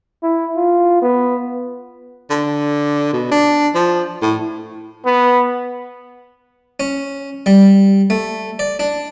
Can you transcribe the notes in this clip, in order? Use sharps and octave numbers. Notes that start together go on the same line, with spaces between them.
E4
F4
B3
D3
B2
D4
F3
A2
B3
C#4
G3
A3
D5
D4